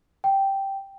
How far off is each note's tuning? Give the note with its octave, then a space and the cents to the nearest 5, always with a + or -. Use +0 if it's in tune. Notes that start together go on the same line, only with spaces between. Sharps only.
G5 -5